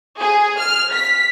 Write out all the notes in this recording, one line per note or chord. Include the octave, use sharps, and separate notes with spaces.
G#4
F6
B6